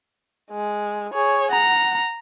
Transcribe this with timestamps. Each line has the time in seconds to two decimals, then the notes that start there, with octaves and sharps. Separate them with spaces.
0.51 G#3
1.13 G#4 C#5
1.51 F#5 A#5